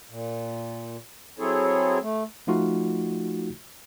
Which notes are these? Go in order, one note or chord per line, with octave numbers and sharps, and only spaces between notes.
A#2
F#3 C4 E4 G#4 A4 C#5
A3
F3 A3 D#4 F4 F#4